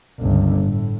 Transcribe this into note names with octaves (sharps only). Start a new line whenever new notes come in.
G1 C#2
A2